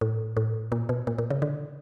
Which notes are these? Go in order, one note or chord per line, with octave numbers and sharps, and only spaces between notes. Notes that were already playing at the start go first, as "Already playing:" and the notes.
A2
A2
A#2
B2
A#2
A#2
C#3
D3